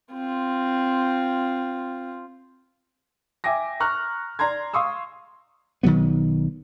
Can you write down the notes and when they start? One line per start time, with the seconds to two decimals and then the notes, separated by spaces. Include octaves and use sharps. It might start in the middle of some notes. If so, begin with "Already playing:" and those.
0.12 C4 F4
3.44 E5 G5 G#5 D6 A#6
3.80 A#5 C#6 F6 F#6
4.39 D5 A#5 C6 G#6
4.73 F5 C6 C#6 D#6 E6
5.83 B1 D#3 F#3 B3